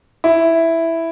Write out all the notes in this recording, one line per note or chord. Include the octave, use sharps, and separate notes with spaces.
E4